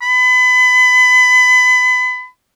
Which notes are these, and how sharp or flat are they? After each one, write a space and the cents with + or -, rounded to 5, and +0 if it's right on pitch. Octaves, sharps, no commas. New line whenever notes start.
B5 +30